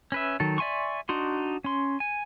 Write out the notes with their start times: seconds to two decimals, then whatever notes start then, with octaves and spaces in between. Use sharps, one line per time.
0.12 C#4 B4 E5
0.40 D#3 F#3 A4
0.58 D5 E5 G#5 C6 C#6
1.09 D4 D#4 F#4 C6
1.64 C#4 C6
2.00 G#5